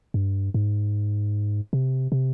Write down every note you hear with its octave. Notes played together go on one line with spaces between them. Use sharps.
G2
G#2
C3
C3